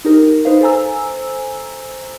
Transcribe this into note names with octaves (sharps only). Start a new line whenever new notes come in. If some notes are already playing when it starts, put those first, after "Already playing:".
D#4 G4 A#4
D#4 B4 C5 F5
A4 C5 G#5 A#5 E6